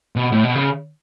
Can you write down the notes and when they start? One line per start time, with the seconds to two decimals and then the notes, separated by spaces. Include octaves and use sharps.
0.16 B2
0.32 A2
0.44 B2
0.55 C#3